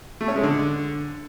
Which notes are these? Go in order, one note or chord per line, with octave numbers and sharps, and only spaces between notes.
A3
C#4
G#3
D3